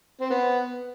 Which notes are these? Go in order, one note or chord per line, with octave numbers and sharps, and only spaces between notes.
C4
B3